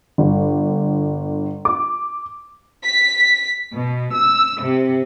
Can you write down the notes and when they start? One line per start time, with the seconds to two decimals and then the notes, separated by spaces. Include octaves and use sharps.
0.18 G1
1.65 D6
2.83 B6
3.75 B2
4.15 E6
4.64 C3